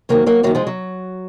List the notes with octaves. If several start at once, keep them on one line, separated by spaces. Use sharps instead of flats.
G#2 D#3 F#3 A#3
F#3 A#3
F#2 D#3 F#3 A#3
F3 G#3
F#3